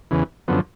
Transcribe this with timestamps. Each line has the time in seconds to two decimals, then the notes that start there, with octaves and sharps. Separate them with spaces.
0.11 E2 C#3 E3
0.48 F#2 D3 F3 B3